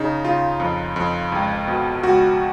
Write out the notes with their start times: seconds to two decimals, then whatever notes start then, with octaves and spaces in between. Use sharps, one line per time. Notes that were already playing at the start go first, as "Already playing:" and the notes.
Already playing: C#3 D#4
0.24 C#3 F4
0.60 F2
0.96 F2
1.32 C#2
1.67 B2
2.03 C#2 F#4